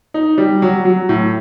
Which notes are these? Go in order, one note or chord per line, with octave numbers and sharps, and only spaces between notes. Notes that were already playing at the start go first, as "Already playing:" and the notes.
D#4
G3
F#3
F#3
A2